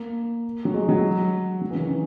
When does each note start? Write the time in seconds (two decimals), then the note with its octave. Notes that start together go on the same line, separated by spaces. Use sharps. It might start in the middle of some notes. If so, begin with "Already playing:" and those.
Already playing: A#3
0.65 F#3
0.74 G#3
0.89 F#3
1.61 F#3
1.70 E3
1.75 C#3
1.80 D#3
1.89 C#3